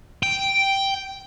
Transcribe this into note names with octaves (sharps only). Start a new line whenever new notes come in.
G5